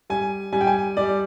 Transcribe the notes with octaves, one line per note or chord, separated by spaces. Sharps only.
G3 G#5
G3 G#5
G5
G#5
G3 D5